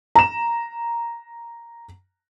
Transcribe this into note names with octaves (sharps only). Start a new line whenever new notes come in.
A#5 E7